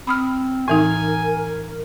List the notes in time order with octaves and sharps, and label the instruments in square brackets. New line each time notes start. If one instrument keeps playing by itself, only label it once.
[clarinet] C4 [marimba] B5 D#6 F6
[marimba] A2 E3 D#4 [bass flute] A#4 [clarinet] G#5